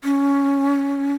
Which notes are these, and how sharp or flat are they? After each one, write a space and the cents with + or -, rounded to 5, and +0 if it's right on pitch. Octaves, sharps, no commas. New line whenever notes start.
C#4 +10